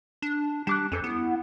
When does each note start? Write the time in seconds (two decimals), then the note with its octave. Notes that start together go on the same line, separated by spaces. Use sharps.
0.22 D4
0.67 G3 D4 D6 F#6
0.92 F2 C#4 A4 C5
1.04 B3 E4